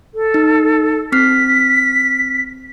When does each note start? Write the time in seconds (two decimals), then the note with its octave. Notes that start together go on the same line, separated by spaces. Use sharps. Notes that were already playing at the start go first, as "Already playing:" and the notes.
0.14 A4
0.34 D#4
1.12 C4 F6 B6 C7